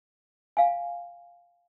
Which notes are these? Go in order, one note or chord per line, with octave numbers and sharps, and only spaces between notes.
F5 G#5